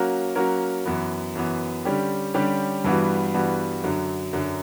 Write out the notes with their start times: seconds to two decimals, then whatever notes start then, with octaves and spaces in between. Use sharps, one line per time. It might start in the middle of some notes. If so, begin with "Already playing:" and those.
Already playing: F#3 A#3 C#4 F#4 A#4
0.35 F#3 A#3 C#4 F#4 A#4
0.86 F#2 E3 B3
1.35 F#2 E3 B3
1.85 D3 G3 C#4 G4
2.34 D3 G3 C#4 G4
2.84 G2 E3 G3 B3 F#4
3.34 G2 E3 G3 B3 F#4
3.84 F#2 D3 F#3
4.33 F#2 D3 F#3